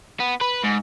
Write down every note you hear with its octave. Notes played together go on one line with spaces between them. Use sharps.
B3
B4
G#2